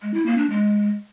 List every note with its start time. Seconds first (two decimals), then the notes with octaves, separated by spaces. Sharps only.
0.02 G#3
0.14 E4
0.26 A#3
0.38 D4
0.50 G#3